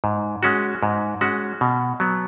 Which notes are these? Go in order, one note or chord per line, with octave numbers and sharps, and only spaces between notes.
G#2
G#3 C#4 F#4
G#2
G#3 C#4 F#4
B2
F#3 B3